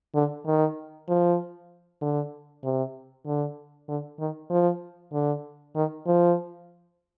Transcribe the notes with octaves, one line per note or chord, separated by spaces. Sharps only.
D3
D#3
F3
D3
C3
D3
D3
D#3
F3
D3
D#3
F3